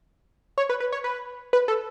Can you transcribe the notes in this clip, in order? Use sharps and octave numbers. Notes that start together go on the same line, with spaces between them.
C#5
B4
B4
C#5
B4
B4
A4